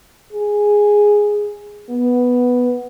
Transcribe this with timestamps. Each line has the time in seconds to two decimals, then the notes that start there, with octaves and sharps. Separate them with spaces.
0.33 G#4
1.90 B3